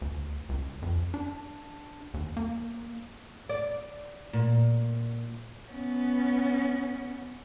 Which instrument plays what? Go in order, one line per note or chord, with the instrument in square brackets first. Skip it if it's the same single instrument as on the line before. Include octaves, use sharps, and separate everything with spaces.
[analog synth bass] D2
C#2
F2
D4
D#2
A#3
[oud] D5
A#2
[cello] B3 C#4